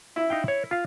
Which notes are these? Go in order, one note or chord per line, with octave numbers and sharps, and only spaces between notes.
E4
D#4 F5 G5
C#5
F4 F5